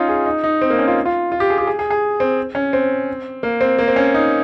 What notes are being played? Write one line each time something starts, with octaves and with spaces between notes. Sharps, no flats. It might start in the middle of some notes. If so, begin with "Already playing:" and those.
Already playing: C#4 D#4 F4
G#4
D#4
D#4
C4
A#3
C#4
F4
F4
F4
G4
G#4
G4
G#4
G#4
G#4
C4
C#4
C4
A#3
C4
A#3
C4
C#4
D#4